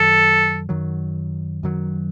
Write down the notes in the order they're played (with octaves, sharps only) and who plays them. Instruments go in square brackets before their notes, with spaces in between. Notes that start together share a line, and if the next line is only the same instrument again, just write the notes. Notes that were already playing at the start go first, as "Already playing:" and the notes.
Already playing: [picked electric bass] F#2 D#3 F#3 [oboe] A4
[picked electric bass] F#2 D#3 F#3
F#2 D#3 F#3